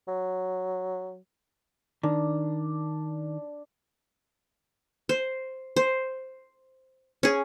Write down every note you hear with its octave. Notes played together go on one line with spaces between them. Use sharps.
F#3
D#3 D4
C5
C5
C#4 G#4